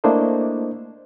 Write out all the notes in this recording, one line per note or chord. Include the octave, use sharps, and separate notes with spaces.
A3 A#3 D4 E4 C5 D#5